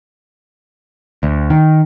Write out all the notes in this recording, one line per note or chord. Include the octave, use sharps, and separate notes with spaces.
D2
D#3